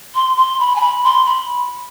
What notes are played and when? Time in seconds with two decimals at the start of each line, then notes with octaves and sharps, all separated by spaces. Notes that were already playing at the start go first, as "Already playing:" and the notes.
0.15 C6
0.37 C6
0.60 B5
0.76 G#5
0.81 B5
1.04 C6
1.25 B5